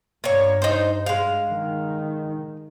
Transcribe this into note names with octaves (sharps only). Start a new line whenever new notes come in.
G2 A#3 C#5
D#4 C5
G#3 F5
D#3